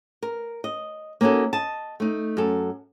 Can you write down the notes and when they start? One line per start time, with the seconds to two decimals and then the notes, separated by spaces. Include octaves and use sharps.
0.22 A#4
0.64 D#5
1.21 A#3 C#4 D#4 F#4 A4
1.53 D#5 A5
2.00 A3 D#4
2.37 F#2 A4